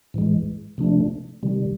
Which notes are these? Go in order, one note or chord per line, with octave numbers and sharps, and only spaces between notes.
A2 E3 G#3
C3 F3 A3 D4
C3 D#3 G3